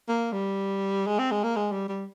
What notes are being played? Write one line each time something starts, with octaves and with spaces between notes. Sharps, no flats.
A#3
G3
G#3
C4
G#3
A#3
G#3
G3
G3